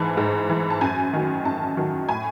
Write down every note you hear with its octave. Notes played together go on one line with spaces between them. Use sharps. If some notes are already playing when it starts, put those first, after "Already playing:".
Already playing: G#2 E3 A5
G#2
E3
A5
F#2 G#5
D#3 F#3
F#2 A5
D#3 F#3
A2 G#5